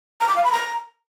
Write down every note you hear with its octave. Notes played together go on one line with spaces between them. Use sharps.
A#5
D6
F5
B5
A#5